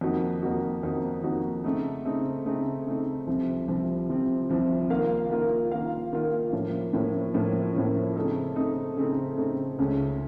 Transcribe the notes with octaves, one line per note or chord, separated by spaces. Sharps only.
F2 D#3 A#3 D#4 F#4
F2 D#3 A#3 D#4 F#4
F2 D#3 A#3 D#4 F#4
F2 D#3 A#3 D#4 F#4
C#3 A3 C4 D#4
C#3 A3 C4 D#4
C#3 A3 C4 D#4
C#3 A3 C4 D#4
C2 C3 F3 C4
C2 C3 F3 C4
C2 C3 F3 C4
C2 C3 F3 C4
D#3 A#3 F4 A#4 F5
D#3 A#3 F4 A#4 F5
D#3 A#3 F4 A#4 F5
D#3 A#3 F4 A#4 F5
A2 F3 A#3 C#4
A2 F3 A#3 C#4
A2 F3 A#3 C#4
A2 F3 A#3 C#4
C#3 A3 C4 D#4 A4
C#3 A3 C4 D#4 A4
C#3 A3 C4 D#4 A4
C#3 A3 C4 D#4 A4
C#2 C#3 A3 C#4